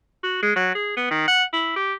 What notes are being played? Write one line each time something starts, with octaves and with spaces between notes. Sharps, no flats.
F#4
G#3
F#3
G#4
B3
D#3
F#5
E4
G4